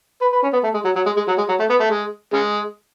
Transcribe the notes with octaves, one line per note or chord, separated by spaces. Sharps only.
B4
B4
C#4
B3
A3
G#3
F#3
F#3
G#3
G#3
F#3
G#3
F#3
A3
B3
A3
G#3
C#3 G#3